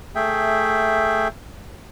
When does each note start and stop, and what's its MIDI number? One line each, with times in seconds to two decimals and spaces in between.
0.15 1.28 57
0.15 1.28 68
0.15 1.28 76
0.15 1.28 79